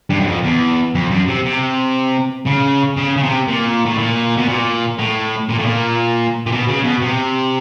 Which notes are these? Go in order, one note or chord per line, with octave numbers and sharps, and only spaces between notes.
G2
F#2
F2
E2
F2
F#2
C3
C3
C#3
C#3
C#3
C3
A#2
A2
A#2
B2
A#2
A2
A#2
A2
A#2
A#2
B2
C#3
B2
C3